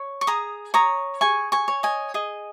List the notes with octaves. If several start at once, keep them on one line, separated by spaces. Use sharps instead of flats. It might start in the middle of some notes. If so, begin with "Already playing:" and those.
Already playing: C#5
C#6
G#4 A#5 D#6
C#5 A#5 D#6
G#4 G#5 C#6
G#5 C#6
C#5
D#5 G#5
G#4 D#5